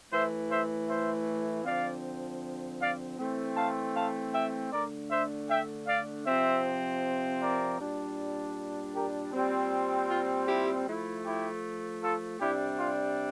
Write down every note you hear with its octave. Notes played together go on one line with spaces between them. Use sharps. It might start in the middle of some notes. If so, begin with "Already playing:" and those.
A2 E3 A3 C5 E5
C5 E5
C5 E5
D3 F3 C4 D5 F5
D5 F5
E3 A3 C4
F5 A5
F5 A5
E5 G5
D3 A3 D4 A#4 D5
C5 E5
E5 G5
D5 F5
C3 F3 C4 C5 E5
A#4 D5
A#2 G3 D4
G4 A#4
A#2 G3 C4
F4
E4 G4
F3 A3 E4
E4 G4
F4 A4
C3 G3 D4 E4 G4
F4